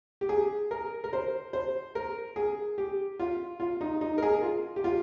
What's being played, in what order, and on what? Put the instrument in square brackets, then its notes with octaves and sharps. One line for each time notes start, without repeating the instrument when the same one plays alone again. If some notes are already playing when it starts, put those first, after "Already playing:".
[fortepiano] G4
G#4
A#4
A#4
C5
C5
A#4
G#4
G4
F4
F4
D#4
D#4
A#4
G#4
F4
G4
F4